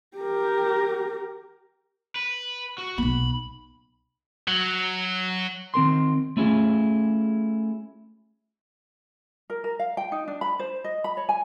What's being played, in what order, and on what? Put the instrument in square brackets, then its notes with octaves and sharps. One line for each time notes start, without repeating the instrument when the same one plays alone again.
[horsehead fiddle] G4 A#4
[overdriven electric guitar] B4
F#4
[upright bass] B1 B3 [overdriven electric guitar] B5
[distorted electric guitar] F#3
[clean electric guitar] D#3 C4 A#4 C6
A3 C#4 E4 F4 G#4
[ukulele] A#4
A#4
F5
G5
D#4
D4
B5
C5
D#5
B5
C#5
G#5